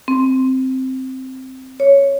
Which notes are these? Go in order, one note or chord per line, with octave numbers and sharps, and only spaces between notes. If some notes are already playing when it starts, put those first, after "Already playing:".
C4
C#5